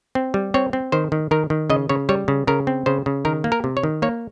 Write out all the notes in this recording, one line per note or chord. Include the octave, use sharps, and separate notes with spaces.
C4
G3
C4 C#5
C4
D#3 C5
D#3
D#3 A#4
D#3
C#3 D#5
C#3 C#5
G3 C#5
C#3
C#3 A#4
C4
C#3 C5
C#3
D#3 A#4
A#3
A#4
C3
C#5
D#3
A#3 C#5